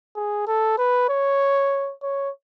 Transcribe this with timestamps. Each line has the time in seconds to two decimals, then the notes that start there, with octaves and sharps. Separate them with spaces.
0.16 G#4
0.47 A4
0.78 B4
1.09 C#5
2.03 C#5